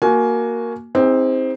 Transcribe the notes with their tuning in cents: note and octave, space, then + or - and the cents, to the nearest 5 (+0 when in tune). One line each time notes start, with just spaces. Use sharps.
A#3 +0 F#4 +0 G#5 +20
C4 +0 D#4 +35 G#4 -40